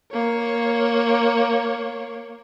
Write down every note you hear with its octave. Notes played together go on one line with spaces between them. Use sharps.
A#3 C#5